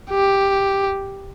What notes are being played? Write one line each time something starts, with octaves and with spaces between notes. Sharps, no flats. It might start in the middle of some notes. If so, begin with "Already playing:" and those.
G4